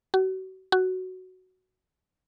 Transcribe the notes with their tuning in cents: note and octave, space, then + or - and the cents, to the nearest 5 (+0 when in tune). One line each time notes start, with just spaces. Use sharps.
F#4 +35
F#4 +5